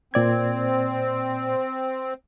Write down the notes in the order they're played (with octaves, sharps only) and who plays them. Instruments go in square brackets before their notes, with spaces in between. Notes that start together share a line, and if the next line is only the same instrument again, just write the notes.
[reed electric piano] A#2 D5 G#6 [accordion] C4